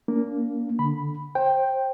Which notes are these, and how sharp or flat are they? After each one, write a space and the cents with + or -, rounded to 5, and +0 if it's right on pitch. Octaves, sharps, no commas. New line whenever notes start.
A#3 +0 D4 -45
D3 +0 B5 +0
C5 +25 G5 +0